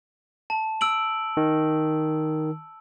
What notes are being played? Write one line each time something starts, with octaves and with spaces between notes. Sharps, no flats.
A5
E6 D7 F#7
D#3